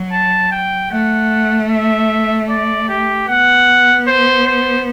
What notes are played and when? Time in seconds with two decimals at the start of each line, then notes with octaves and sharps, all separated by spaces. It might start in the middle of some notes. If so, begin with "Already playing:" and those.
Already playing: F#3
0.13 A5
0.52 G5
0.91 A3 F#5
1.71 E5
2.49 D5
2.89 G4
3.28 B3 F#5
4.07 C5
4.47 C5